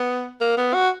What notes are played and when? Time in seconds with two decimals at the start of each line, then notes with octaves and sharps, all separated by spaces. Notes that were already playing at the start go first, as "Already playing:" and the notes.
Already playing: B3
0.41 A#3
0.58 B3
0.75 F#4